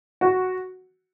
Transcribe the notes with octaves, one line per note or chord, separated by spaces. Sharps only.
F#4